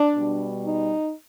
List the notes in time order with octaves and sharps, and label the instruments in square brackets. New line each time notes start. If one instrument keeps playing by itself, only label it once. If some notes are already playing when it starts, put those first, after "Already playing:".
Already playing: [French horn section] D4
B2 G3
D#4